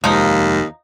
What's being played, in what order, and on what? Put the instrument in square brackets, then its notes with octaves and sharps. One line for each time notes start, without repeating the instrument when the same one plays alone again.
[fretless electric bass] F1 G#3 [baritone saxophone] D#2 [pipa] F3 D#4